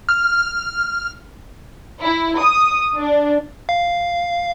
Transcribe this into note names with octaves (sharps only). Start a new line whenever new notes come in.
F6
E4
D#6
D4
F5